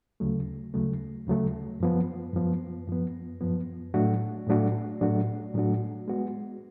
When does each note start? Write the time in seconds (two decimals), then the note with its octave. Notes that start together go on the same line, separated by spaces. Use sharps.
0.20 D2 C#3 F#3 A3
0.74 D2 C#3 F#3 A3
1.27 D2 C#3 F#3 A3
1.80 F#2 F3 B3
2.33 F#2 F3 B3
2.88 F#2 F3 B3
3.41 F#2 F3 B3
3.94 A2 F#3 A3 D4 F#4
4.47 A2 F#3 A3 D4 F#4
5.01 A2 F#3 A3 D4 F#4
5.54 A2 F#3 A3 D4 F#4
6.08 G#3 B3 F#4